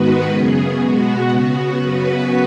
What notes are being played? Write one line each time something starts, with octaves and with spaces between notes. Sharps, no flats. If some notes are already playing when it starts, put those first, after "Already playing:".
Already playing: G#2 D#3 G#3 B3 F#4 B4
F#2 C#3 B3 G#4
B2 G#3 B3 F#4
C#3 B3
F#2 C#3 B3 F#4 B4